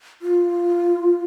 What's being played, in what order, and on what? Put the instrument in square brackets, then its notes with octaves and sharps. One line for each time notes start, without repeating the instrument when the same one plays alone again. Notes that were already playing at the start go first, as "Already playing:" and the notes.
[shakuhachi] F4